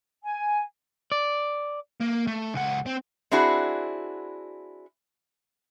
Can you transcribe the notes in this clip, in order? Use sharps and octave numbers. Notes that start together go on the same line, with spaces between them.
G#5
D5
A#3
A3
C#2 F#5
C4
C4 D4 E4 F#4 G#4